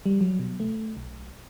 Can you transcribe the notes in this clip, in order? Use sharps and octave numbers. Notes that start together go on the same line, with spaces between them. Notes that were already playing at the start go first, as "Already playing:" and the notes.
G3
F#3
B2
A3
B1